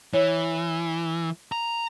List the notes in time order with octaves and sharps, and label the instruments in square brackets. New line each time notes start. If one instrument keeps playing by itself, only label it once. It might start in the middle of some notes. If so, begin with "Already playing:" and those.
[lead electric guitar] E3 [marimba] C#5
[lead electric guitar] A#5